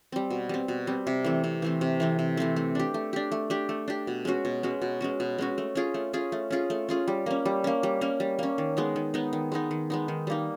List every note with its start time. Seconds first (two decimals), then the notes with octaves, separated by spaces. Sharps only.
0.12 G3 C4
0.30 B2
0.49 G3 C4
0.68 B2
0.87 G3 C4
1.07 C3
1.25 E3 A3 C4
1.44 C3
1.62 E3 A3 C4
1.81 C3
2.00 E3 A3 C4
2.19 C3
2.37 E3 A3 C4
2.56 A3
2.75 D4 G4
2.94 A3
3.13 D4 G4
3.32 A3
3.50 D4 G4
3.69 A3
3.88 D4 G4
4.07 B2
4.25 G#3 C#4 F#4
4.45 B2
4.63 G#3 C#4 F#4
4.82 B2
5.01 G#3 C#4 F#4
5.20 B2
5.38 G#3 C#4 F#4
5.58 A3
5.75 C#4 F4 G#4
5.94 A3
6.13 C#4 F4 G#4
6.32 A3
6.51 C#4 F4 G#4
6.70 A3
6.89 C#4 F4 G#4
7.08 G3
7.26 A#3 C#4
7.45 G3
7.64 A#3 C#4
7.83 G3
8.01 A#3 C#4
8.20 G3
8.39 A#3 C#4
8.58 D#3
8.77 G#3 B3 D#4
8.96 D#3
9.14 G#3 B3 D#4
9.33 D#3
9.52 G#3 B3 D#4
9.71 D#3
9.90 G#3 B3 D#4
10.08 D#3
10.27 G3 A#3 D#4